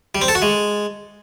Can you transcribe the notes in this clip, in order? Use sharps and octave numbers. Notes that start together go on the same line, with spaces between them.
G3
C4
A4
F#4
G#3